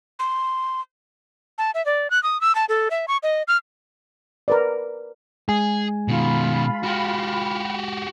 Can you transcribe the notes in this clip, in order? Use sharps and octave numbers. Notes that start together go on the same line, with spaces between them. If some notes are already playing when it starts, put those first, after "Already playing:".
C6
A5
E5
D5
F#6
D#6
E6
A5
A4
E5
C#6
D#5
F6
A#4 B4 D5
G#3 G#4 G#5
B2 D#3 F4 B5
F#4 G4